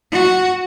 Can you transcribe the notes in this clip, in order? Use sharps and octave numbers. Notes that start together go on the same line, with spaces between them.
F#4